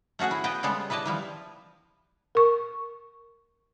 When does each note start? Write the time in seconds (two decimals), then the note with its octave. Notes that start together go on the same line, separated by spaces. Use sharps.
0.19 A3 C#4 F#4 G#4 F#5
0.31 E4
0.44 B3 B4 D#5 G5
0.63 C#3 G3 G#3 B3 A4
0.90 E4 B4 D5 D#5 A5
1.05 F3 G3 E4
2.35 A#4 C#6